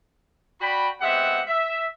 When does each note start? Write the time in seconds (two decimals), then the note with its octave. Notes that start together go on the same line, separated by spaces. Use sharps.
0.60 F#4 D5 G5 B5
1.01 G#3 B3 C4 G4 E5 F#5
1.47 E5